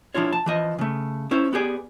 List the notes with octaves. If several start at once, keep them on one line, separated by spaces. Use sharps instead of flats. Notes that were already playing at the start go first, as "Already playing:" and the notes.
F3 D4 E4 F4 C#5
A5
E3 F3 D#5
C#3 A3
C#4 E4 C5
B3 G4 G#4 D5